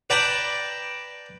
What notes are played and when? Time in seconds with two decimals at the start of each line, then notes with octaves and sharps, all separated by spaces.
0.10 B4 D5 G5 A5 A#5